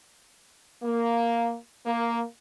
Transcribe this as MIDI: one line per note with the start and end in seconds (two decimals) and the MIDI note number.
0.83 1.55 58
1.86 2.21 58